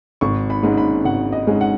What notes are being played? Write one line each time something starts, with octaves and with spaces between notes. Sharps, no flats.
G#1 C#6
B5
G#2 G#3 C#4
B5
G#1 F#5
D#5
G#2 G#3 C#4
F#5